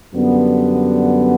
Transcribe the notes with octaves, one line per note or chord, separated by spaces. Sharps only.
F#2 D3 G3 B3